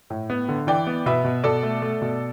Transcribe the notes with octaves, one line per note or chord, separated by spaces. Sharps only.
A2
B3
D3
E3 D5 G5
B3
B2 B4 E5
B2
B2 A4 D5
A3
A3
B2